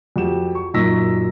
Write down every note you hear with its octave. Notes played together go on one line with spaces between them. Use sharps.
F2 F#4 G4 E7
C#6
F#2 A#2 D#4 E6 A#6 B6